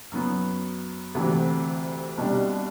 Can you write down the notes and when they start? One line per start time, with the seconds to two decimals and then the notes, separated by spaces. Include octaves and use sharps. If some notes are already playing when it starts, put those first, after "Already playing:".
0.12 F#2 F#3 B3
1.15 D2 C3 E3
2.17 C2 B2 G3 D4